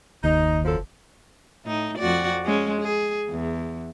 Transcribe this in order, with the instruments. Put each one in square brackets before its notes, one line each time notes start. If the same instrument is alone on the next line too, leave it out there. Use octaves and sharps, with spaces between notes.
[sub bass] F#1 [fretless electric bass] D#2 [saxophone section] D#4
[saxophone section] F#2 F3 A4
[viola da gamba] A2 D#4
F2 F#4 D5
G#3 C#4
G#4
E2